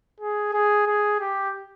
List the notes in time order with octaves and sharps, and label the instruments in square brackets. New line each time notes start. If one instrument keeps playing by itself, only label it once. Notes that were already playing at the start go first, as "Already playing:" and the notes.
[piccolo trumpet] G#4
G#4
G#4
G4